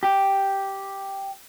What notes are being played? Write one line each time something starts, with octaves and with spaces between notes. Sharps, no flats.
G4